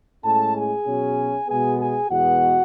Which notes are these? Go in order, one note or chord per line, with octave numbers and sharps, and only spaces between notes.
A2 G#3 C#4 A4 A5
G#4 G#5
B2 F#3 C#4
B2 G#3 B3 G#4 G#5
G#4 G#5
E2 B2 G#3 B3 F#4 F#5